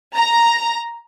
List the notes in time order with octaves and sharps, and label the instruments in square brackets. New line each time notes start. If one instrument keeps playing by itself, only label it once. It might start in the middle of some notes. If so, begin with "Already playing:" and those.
[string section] A#5